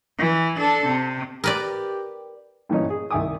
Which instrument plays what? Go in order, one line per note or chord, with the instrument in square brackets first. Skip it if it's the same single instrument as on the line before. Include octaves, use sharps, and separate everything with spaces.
[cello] E3
D4 A4
C3
[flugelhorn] G4 [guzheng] A#4 B4 D5
[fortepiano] G2 A#2 E3 C#4 D#4
G#4
C2 D#3 E5 G#5 D6 D#6